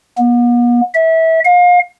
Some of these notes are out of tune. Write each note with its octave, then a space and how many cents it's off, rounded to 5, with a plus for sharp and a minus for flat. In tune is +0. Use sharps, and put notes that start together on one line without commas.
B3 -45
E5 -25
F5 +35